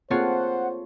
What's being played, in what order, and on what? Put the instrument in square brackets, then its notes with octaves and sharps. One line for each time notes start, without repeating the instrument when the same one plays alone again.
[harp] A3 F4 C#5 [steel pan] A#3 C4 G#4 [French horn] C5 [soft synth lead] F#5